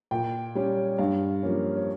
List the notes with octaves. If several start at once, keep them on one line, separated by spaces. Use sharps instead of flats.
A#2 G5
G3 C#4
G2 F5
F3 A#3 C#4
C#5